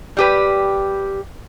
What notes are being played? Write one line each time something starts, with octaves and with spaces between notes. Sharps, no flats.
G3 G4 B4